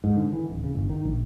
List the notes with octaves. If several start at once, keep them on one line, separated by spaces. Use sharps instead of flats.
G#2
D3
E3
D1
C#3
G1
D#3
A#1